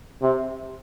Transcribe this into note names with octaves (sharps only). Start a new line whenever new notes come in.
C3